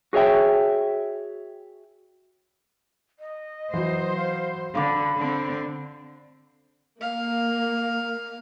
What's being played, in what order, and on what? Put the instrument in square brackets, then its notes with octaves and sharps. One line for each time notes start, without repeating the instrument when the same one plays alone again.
[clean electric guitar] F#4 G#4 C#5 E5 G5
[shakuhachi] D#5
[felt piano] E3 F#3 [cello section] C5
[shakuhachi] F5
[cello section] D3 [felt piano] F5 D6 [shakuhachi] B5
[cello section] D3 C4
[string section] A#3 [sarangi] F5